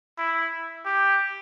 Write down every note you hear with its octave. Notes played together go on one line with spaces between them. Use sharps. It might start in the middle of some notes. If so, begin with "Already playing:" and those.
E4
G4